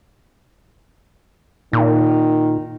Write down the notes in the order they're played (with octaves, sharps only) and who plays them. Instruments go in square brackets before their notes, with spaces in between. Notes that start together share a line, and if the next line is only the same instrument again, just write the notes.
[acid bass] A#2 [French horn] D#3